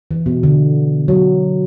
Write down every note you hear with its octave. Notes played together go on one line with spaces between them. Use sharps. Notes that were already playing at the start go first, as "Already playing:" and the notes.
E3
B2
D3
F#3